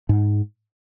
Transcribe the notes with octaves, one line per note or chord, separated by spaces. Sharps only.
G#2